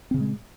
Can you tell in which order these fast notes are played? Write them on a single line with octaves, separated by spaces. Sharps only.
C4 C#3 A#2 G#3